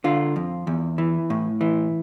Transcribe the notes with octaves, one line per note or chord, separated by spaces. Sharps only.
D3 F4
F2
E2
E3
A2
E3